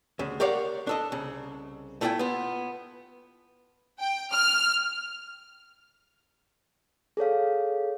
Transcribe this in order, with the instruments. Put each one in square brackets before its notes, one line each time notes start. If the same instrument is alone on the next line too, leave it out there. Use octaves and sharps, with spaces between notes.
[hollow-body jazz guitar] D2 C#3
G4 A#4 C#5 D5 F5 F#5
D4 A4 D#5
C2 C#3
A3 E4 F4 D5 G5 G#5
B3 F4
[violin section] G5
F6
[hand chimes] G#4 A4 C#5 F5